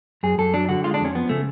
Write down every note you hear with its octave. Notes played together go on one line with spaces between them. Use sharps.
F#2 G#4
F#2 A4
F#3 D4
D3 F#4
G#3 F4
D4
F2 C#4
F3 B3
C#3 A3